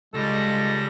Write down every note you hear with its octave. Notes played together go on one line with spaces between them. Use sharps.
C#2 G3 G#3 A4 A#6